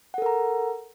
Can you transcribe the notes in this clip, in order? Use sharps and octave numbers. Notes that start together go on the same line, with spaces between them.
A4 A#4 F#5 A#5